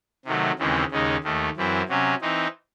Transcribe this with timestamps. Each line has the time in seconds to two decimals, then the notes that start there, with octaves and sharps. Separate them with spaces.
0.25 C3 D#3 F#3 A3
0.58 D#2 C#3 E3 G#3 C4
0.91 D#2 C#3 G#3 D#4
1.23 D#2 D#3 A3
1.56 F#2 E3 C4 E4
1.88 C3 F#3 C#4
2.21 E3 C4 D#4